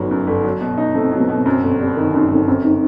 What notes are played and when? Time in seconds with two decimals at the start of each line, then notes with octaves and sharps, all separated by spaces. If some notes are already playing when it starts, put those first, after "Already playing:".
Already playing: G1 F#2 F#3 B3 D#4
0.11 F#2
0.27 G1
0.44 F#3
0.61 B2
0.78 D#4
0.95 A3 C4
1.12 F#3
1.21 B3
1.28 B2
1.45 F#2 C4
1.63 G1
1.80 G3
1.96 D#3 D#4
2.09 D#4
2.14 F#2
2.22 D#4
2.30 G1 C4
2.48 F#2 C4
2.65 D#4